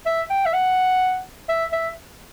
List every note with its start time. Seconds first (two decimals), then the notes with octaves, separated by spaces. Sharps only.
0.06 E5
0.30 G5
0.46 E5
0.53 F#5
1.49 E5
1.72 E5